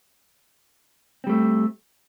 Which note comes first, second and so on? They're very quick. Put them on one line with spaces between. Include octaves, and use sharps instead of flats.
C4 G3 A3